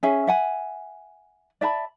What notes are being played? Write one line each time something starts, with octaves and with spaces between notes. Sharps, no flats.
C#4 G#4 E5 G#5
E5 F#5 G#5
D5 E5 A5 B5